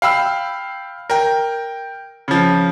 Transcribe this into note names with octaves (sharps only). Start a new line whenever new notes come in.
F5 G5 B5 E6
A#4 G5
C#3 F3